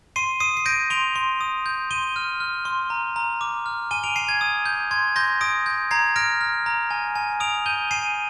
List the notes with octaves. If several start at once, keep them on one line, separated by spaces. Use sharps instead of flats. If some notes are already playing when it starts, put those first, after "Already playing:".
C6 C7 D#7
D#6 C7 D#7
C7
G6 A#6 D7
C6 D7 F7
C6
D#6
G6
C6 D#7 G7
F6
F6
C6
A#5
A#5
D6
F6
G#5 D#7 G7
D7 F7
G#5 C7 D#7
G#6
D#6
G6
C6 G#6
C6 G6 A#6
D#6 A#6 D7
G6
A#5 G#6 C7
F6 A#6 D7
F6
A#5
G#5
G#5
D#6 D7 F7
G6 D#7 G7
G#5 C7 D#7